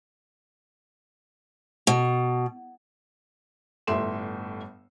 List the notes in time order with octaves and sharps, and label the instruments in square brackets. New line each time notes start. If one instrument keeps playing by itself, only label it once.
[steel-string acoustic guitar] B2
[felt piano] G1 A2 E5 C6 E7